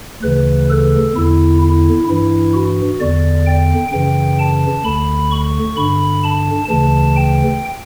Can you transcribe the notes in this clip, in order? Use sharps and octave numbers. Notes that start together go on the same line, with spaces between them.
D2 C#3 E3 B4
A4
E2 D3 E4
E4
G2 E3 E4
F#4
E2 D3 D5
G5
F#2 C#3 E3 G5
A5
D2 D3 B5
C#6
G2 D3 B5
A5
D2 C#3 E3 A5
G5